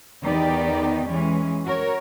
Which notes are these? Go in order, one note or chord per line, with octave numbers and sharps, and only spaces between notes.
E2 D#3 B3 D#4 G4 D5
E3 G#3 C#4
F#4 A#4 C#5